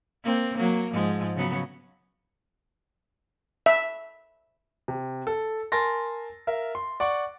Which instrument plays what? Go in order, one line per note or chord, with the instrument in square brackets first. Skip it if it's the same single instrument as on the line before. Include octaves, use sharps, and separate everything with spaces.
[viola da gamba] A#3 C4
F#3 A#3
G#2 F3 G#3
C#3 F#3 B3
[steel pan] E5
[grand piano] C3
A4
A#4 G#5 A5 C6 A6 A#6
A#4 E5 F5
C6
D5 F#5 C#6